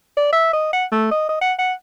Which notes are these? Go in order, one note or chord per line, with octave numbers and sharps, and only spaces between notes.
D5
E5
D#5
F#5
A3
D#5
D#5
F#5
F#5